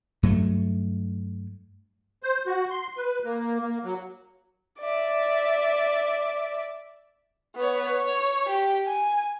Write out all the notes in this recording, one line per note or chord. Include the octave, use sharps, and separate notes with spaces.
G2 F#3 A3
C5
F#4
C6
B4
A#3
A#3
F#3
D5 E5
B3 C#5
C#5
G4
G#5